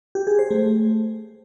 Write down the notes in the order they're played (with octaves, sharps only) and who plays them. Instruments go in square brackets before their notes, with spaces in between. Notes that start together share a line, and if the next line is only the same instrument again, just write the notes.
[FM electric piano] G4
G#4
C5
A3